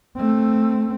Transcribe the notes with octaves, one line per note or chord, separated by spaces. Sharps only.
A3 C4